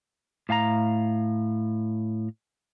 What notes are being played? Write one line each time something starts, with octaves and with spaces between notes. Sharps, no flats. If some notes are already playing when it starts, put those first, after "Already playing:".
A2 F5 G#5 A#5